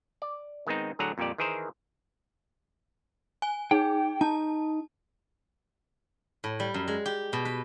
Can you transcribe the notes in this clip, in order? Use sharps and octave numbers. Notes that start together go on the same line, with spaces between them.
D5
D#3 G#3 B3 C4 D#4
A2 D3 F#3 G#4 F#5 A#5
F2 A#2 G3 G4 D5
D#3 E3 G#4 A#4 C5
G#5
D#4 G#4 G5
D#4 A5
A2
G3
F#2
G#3
G4
B2
B4